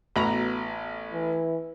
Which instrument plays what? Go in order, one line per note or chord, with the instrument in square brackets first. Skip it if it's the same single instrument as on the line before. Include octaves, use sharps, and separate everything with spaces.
[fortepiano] A1 B5 [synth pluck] B3 F#4 A#5
[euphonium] E3